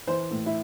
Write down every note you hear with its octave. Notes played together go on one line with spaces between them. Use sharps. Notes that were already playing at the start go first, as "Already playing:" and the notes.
E3 C5
A2
E4